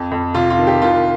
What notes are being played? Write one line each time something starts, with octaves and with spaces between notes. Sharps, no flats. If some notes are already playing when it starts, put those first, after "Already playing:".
Already playing: F2
F2
C3 F4
F4
D#3
G4
C2 F4